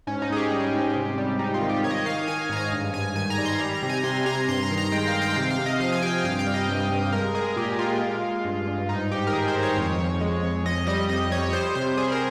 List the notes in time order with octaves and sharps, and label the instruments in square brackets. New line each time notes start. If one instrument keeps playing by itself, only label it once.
[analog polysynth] G#2 C#4
D#4
G#2 G#4
G4
G3
G#2
C3
G3
C3 D#4
F4
D#3
G4
D#3 C#5
D#5
C#5
D#3 F5
D#3 G#5
G#2 A#5
G#5
G2
G2 G#5
D#3 G#5
A#5
G3
C6
G3 A#5
A#5
C3
G#5
C3 C6
C3 A#5
G2 C6
A#5
D#3
A#5
G#3 G5
F5
G#3
G5
C3 F5
F5
C3
D#5
F3 F5
G#5
C3 G5
G2 F5
G5
G3
D#5
G2
G2
G#3 A#4
G#3 G#4
G#4
A#2 G4
G#3 F4
G#3
G#3
G2
G2
G#2 D#4
G#2 G4
A#4
D#3 G#4
C5
D#3
C#5
F2
F2
G#3
F2
F2 D#5
G3 D#5
F2 D#5
F2 C#5
G3 C5
C3 C5
G3 G#4
A#4